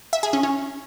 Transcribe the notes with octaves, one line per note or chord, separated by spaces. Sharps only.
E5
G#4
C#4
C#4